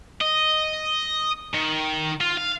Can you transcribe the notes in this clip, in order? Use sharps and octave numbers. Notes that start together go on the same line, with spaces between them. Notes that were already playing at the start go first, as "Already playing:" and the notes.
D#5
D#3
F4
F5